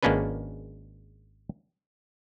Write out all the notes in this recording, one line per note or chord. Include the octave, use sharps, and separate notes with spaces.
G#1 G#3 A#3 C#4 D4 B4